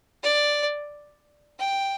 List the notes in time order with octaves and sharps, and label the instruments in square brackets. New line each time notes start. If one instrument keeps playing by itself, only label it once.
[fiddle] D5
G5